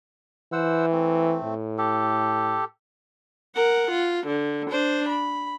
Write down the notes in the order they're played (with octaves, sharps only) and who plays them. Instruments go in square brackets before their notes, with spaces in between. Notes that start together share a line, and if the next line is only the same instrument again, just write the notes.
[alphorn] E3 [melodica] C5 F#5 E6
[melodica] A3 C4
[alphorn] A2
[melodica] G4 A4
[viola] A#4 F#5
F4
D3
D4 C5
B5